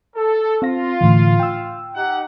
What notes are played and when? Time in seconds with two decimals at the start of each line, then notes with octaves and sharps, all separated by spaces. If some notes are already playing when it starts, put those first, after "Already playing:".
0.15 A4
0.62 C4 F4 F5 A#6
1.01 A2 D3 E3
1.40 G5 E6
1.94 D#4 G4 F#5